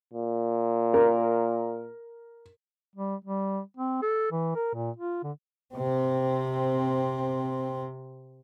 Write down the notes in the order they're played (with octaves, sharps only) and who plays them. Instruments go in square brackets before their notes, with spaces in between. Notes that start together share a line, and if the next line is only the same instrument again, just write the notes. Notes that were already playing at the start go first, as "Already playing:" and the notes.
[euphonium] A#2
[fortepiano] A#4
[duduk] G3
G3
C4
A4
E3
A#4
A#2
F4
D3
[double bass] C3 C4